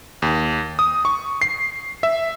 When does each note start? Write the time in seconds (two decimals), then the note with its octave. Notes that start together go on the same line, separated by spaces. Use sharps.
0.22 D#2
0.79 D#6
1.05 C#6
1.42 C7
2.03 E5